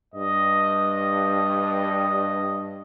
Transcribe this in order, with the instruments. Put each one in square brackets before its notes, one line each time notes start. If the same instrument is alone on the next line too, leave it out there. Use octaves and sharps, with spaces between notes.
[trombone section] G2 [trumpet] D#5